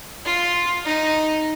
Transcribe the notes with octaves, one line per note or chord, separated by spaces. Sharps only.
F4
D#4